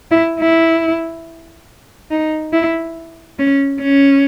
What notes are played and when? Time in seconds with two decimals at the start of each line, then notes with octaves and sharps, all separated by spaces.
0.11 E4
0.40 E4
2.11 D#4
2.53 E4
3.39 C#4
3.82 C#4